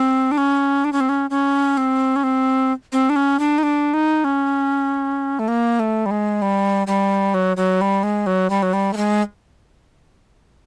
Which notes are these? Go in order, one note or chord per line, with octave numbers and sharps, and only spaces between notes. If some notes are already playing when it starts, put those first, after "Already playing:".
Already playing: C4
D4
C#4
D4
C#4
C4
C#4
C#4
C4
C#4
C4
C4
D4
C#4
D4
D#4
D4
D#4
C#4
A3
A#3
A3
G3
G#3
G3
G3
F#3
F#3
G3
G#3
F#3
G3
F#3
G3
A3
G#3